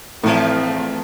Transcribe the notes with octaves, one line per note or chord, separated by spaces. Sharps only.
E2 A2 F3 A3 C4